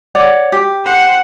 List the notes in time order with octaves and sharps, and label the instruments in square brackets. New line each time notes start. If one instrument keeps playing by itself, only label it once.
[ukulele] C#5 D5 F#5
G4
[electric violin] C5 F#5